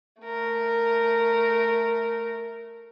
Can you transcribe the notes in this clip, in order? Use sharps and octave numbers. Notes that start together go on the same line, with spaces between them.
A3 A#4